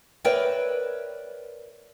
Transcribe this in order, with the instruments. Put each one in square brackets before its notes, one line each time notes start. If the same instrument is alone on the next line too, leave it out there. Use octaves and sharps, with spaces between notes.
[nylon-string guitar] A#4 B4 C#5 D5 E5 G5